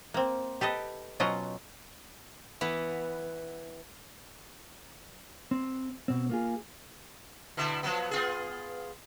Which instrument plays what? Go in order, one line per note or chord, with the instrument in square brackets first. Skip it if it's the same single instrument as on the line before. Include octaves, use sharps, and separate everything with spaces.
[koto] A#3 C4
G4 A4 B4 D#5
B2 F#3 C#4 F4 D#5 F#5
[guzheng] E3 B3
[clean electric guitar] C4
B2 C4
A#3 F4 G#4
[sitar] B2 D3 E4
F3 F#3 B3
B3 F4 G#4